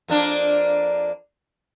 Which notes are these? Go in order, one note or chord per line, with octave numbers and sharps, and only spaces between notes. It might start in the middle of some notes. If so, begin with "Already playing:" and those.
F2 A#3 D4